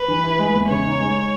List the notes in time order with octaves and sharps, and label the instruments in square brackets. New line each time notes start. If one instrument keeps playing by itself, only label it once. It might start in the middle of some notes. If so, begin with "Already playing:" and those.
Already playing: [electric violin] B4
[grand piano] E3
E4
G#3
E2
[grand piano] C#3 [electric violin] C#5
[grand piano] D#4
G#3